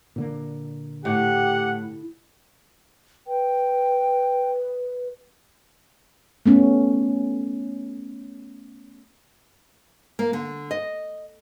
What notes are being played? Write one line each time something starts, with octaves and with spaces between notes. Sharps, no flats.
A#2 D3 A#3
A2 G4 F#5
B4 G5
A3 B3 C#4
A#3
D3
D#5